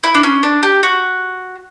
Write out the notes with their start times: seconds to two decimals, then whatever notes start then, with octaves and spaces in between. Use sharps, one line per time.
0.04 E4
0.15 D4
0.23 C#4
0.43 D4
0.63 G4
0.83 F#4